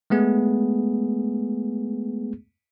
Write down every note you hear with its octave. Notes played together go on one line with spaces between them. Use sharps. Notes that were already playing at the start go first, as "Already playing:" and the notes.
G#3 A3 B3 G#4